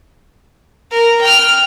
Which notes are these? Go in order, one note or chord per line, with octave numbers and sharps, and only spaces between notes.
A#4
G5 F6